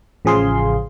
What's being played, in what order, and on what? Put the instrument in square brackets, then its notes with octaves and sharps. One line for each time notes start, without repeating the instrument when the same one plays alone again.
[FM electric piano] A1 C#3 F3 G#4 F5 C6